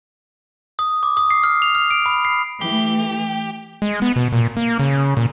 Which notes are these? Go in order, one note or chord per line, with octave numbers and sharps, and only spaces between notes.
D#6
D6
D#6
C7
F6
F7
F6
D7
B5
C7
E3 A3 G4
G#3
B3
B2
A#2
A#3
C#3
A#2